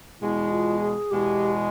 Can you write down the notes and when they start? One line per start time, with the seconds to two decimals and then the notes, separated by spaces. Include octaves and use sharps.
0.20 E2 B2 G#3 E4
0.51 F4
0.81 G#4
1.11 E2 B2 G#3 G4